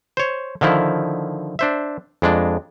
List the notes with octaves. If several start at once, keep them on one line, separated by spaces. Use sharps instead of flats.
C5 C#5
D3 D#3 F3 E4
D4 C5 E5
F2 G#3 D4